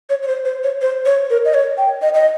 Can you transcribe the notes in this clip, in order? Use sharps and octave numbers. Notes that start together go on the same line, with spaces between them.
C#5
C#5
C5
C5
C#5
C5
C#5
A#4
D#5
C#5
G5
D#5
D#5